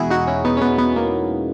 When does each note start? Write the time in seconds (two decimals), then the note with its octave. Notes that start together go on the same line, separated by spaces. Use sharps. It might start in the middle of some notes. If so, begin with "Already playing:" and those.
Already playing: E2 B2 G#3 E4 F#4 G#4
0.10 D#4 F#4
0.27 C#4 E4
0.45 B3 D#4
0.57 C#4
0.61 B3
0.78 B3
0.96 A#3